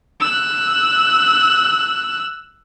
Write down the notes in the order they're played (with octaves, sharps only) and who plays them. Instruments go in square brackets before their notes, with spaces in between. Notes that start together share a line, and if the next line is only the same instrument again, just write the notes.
[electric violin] E6 F#6